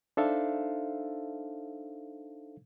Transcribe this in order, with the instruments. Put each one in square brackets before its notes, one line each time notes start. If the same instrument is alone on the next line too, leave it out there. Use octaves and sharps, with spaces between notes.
[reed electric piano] D4 D#4 A4 C5 E5 F5